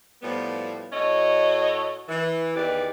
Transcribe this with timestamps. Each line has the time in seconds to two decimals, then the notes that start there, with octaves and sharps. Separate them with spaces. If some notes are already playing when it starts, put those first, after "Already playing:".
0.22 A2 F3 G3 B3
0.93 A2 F#4 A4 C#5 D#5
2.09 E3
2.56 E2 D#3 G4 B4 D5